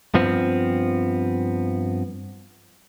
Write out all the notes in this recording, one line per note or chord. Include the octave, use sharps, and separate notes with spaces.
G2 F3 B3 C4